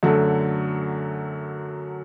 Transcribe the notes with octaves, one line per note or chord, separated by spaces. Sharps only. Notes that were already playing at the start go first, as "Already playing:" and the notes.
F#2 D3 F#3 A3